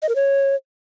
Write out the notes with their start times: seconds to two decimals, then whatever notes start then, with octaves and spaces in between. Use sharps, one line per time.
0.02 D#5
0.09 A#4
0.15 C#5